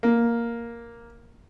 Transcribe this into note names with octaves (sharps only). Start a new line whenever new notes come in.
A#3